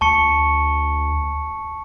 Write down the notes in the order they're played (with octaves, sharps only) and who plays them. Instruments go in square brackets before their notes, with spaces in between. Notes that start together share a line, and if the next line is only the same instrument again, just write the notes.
[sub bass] D2 [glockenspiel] A5 C#6 C#7